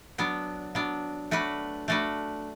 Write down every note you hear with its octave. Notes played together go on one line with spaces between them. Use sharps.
F#3 B3 D4
F#3 B3 D4
A3 D4 F#4 B4
A3 D4 F#4 B4